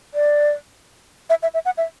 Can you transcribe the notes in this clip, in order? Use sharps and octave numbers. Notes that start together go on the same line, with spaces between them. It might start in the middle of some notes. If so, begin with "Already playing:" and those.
D5
E5
E5
E5
F#5
E5